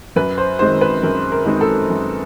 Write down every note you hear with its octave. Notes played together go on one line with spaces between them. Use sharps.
F#2 B4
C5
D#3 G#3 C4 D#4 C5
B4
F#2 A#4
A#4
D#3 G#3 C4 D#4
A4
F#2